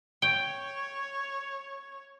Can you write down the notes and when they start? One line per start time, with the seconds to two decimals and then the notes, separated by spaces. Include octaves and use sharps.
0.22 C#5 G5